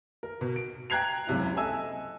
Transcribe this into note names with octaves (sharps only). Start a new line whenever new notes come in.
A#4
B2
D7
G5 A#5 F#6 G#6 C7 F7
F#1 C#2 C3 E4
A4 D#5 E5 G#5 E6